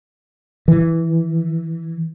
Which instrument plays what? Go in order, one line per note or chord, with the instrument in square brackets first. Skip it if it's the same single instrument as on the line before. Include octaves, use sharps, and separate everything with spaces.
[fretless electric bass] E3